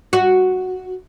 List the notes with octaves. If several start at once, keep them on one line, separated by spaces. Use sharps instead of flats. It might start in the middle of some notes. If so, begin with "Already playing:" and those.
F#4